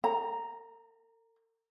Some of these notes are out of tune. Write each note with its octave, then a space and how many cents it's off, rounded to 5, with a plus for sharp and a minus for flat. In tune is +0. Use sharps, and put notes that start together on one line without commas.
A#4 -45 A#5 +0